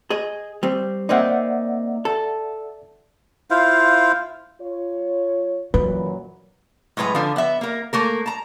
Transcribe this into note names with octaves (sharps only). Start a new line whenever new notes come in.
G#4 D#5
G3 C4
A#3 C4 D#4 D5 E5 F#5
A4
E4 F4 C5 F5
F4 C#5
F#2 A#2 E3 F#3 B4
A2 F#3 G#3 B4 A#5
D3 F3
B3 E5
A#3 A#4
A3 A#3 A#4
A5 A#5